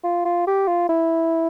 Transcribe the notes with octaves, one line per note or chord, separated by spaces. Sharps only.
F4
F4
G4
F4
E4